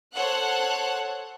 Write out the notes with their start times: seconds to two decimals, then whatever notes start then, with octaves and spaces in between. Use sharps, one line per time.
0.13 A4 C5 C#5 F#5 F#6